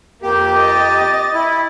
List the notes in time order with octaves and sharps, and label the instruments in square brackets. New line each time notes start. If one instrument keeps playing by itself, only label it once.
[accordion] F2 G4 [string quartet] A#3
[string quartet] D#5 A6
[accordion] E4